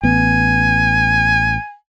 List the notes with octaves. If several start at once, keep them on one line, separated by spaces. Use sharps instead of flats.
A1 B3 G#5